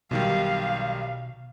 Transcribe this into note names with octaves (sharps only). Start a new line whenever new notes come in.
B1 B2 D#3 G3 F5